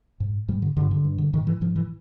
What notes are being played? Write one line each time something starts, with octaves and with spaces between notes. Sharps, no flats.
G#2
G#2 G3
D3
G2 D3
D3
G2
D3
G#2 D#3
E3
G#2 F3
E3